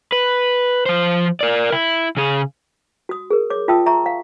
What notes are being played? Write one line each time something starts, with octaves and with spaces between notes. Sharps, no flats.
B4
F3 C5
A#4 D5
E4
C#3 G#4
F#4 D#6
G#4 A#4
C#5 D6
F4 E5 G5 A5 D#6 E6
E5 A#5 C6 C#6
F5